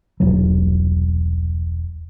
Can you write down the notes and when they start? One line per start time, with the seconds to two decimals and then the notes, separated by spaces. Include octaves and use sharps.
0.20 E1 C2 F#3